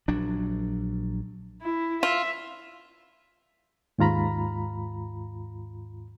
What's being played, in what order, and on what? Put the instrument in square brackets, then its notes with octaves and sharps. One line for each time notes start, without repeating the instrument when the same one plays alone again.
[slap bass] A#1 F#3 D4
[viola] E4
[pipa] F4 [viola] E5
[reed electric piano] D#2 G#2 F4 A#5 B5